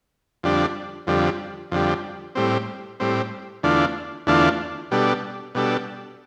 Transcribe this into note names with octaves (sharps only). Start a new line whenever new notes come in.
F2 D3 G3 D4
F2 D3 G3
F2 D3 G3
A2 G3 C4
A2 G3 C4
E2 D3 A3 D4 F4
E2 D3 A3 D4 F4
B2 G3 D4 A4
B2 G3 D4 A4